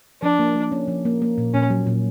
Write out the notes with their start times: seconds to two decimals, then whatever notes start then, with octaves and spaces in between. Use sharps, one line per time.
0.23 F3 D4
0.39 A#3
0.56 A#3
0.72 C#4
0.88 F3
1.05 A#3
1.22 A#3
1.38 A#2
1.54 A#2 C#4
1.70 F#3
1.87 A#2